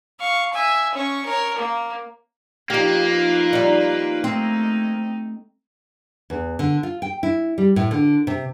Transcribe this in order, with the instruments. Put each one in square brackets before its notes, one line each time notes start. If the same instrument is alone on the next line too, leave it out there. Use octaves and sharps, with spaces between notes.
[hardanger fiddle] F5 C#6
E5 G#5
C#4 C#6
A#4 C#5
A#3
[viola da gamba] F2 F4 B4 [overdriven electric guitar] A#3 [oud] D#4 G4
[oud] G3 D#4
[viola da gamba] A3 D#4 [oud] C4
[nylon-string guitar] E2
D3
F4
G5
E4
G3
A2
D3
C3